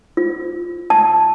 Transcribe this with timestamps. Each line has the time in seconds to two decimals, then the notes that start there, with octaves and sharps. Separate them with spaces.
0.17 F4
0.90 A5